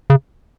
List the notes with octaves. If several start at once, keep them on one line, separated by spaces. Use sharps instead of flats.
C#3